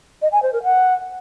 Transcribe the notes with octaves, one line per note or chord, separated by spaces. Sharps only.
D#5
G#5
C5
A#4
F#5